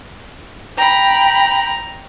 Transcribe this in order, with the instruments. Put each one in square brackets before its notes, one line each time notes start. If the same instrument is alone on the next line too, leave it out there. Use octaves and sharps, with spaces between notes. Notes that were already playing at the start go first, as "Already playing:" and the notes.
[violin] G5 B5 [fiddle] A#5